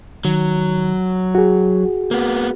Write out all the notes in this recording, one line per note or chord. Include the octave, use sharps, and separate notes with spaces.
D#3 F#3
F#4 G#4
A#3 B3